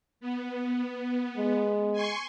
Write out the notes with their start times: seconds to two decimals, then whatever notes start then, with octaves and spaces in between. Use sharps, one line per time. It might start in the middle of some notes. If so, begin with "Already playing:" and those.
0.21 B3
1.37 G#3
1.93 G#5 C6 C#6